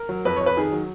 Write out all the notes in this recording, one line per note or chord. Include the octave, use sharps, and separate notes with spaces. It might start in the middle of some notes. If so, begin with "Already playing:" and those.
Already playing: A#4
F#3
F2 B4
F2 C#5
B4
D#3 G#4
F#3